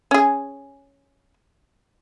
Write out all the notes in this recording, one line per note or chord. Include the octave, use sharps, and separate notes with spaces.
C#4 G#4